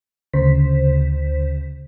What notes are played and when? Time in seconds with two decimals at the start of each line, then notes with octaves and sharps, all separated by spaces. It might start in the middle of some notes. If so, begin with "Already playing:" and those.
0.34 D2 C#3 C5 B6